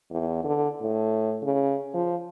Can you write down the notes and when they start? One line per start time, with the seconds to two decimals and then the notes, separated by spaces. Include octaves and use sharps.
0.10 E2
0.44 D3
0.81 A2
1.43 C#3
1.94 F3